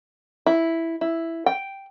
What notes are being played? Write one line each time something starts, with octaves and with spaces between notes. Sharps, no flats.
E4
E4
G5